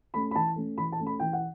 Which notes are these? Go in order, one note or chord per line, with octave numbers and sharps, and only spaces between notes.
A3 C#4 B5
B5
E3 A5
A3 C#4
E3 B5
A5
A3 C#4
B5
E3 G5
F#5